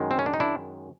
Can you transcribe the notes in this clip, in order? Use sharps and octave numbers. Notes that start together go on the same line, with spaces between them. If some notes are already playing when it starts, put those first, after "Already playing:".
Already playing: F#2 D#3 G#3
C4
C#4
D4
D#4
D4 E4